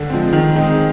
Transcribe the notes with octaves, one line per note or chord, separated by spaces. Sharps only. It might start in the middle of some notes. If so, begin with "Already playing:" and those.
Already playing: D3
F3 G#3 C4
D#3
G#3 C4 D#4